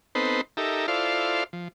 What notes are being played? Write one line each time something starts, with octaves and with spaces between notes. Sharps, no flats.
B3 C4 D#4 A4 B4 C5
D#4 G4 A4 A#4 E5
E4 F4 A4 C5 D5 F5
F3